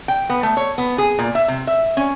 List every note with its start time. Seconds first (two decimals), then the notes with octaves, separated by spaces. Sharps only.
0.08 G5
0.30 B3
0.43 A3
0.57 C#5
0.78 B3
0.98 G#4
1.19 A#2
1.35 E5
1.48 C3
1.67 E5
1.97 C#4